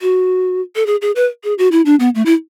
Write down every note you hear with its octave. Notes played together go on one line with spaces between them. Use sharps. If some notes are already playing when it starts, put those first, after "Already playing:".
F#4
A4
G#4
G#4
B4
G#4
F#4
E4
D4
B3
A3
E4